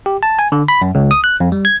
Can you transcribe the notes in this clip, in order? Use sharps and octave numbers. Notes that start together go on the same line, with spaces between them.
G4
A5
G#5
D3
B5
F#2
C#2
D#6
F#6
F2
G3
G#6